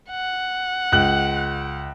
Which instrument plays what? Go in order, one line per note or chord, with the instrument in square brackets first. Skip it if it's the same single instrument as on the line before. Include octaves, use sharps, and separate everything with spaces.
[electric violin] F#5
[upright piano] C#2 F#6 F#7